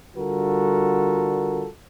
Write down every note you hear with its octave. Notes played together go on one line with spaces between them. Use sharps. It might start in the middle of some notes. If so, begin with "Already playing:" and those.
D3 G3 F4 F#4 A4 A#4